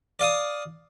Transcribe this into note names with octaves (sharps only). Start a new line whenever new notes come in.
D5 F5 D#6